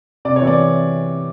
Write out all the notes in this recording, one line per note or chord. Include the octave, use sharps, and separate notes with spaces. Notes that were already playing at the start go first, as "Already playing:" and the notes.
C3 D5
C#5
E3
D5